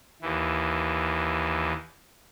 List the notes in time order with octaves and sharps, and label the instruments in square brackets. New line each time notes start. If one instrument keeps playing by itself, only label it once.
[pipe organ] D#2 E3